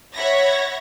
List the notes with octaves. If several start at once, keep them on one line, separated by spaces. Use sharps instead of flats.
C#5 E5 F#5 B5 G#6 A#6